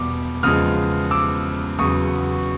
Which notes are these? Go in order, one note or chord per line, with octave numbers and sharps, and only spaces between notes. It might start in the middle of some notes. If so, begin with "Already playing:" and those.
Already playing: E2 B2 G3 D6
E2 C#3 F3 G#3 D#6 F6
D6 E6
E2 C#3 F#3 C#6 D#6